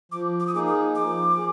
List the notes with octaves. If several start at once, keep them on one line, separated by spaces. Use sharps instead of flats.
F3 D6
D6
D#6
A#3 D#4 G#4 D6
D#6
F3 D6
G#4